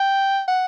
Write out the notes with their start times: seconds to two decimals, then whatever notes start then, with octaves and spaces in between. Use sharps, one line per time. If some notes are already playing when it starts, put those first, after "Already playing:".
Already playing: G5
0.48 F#5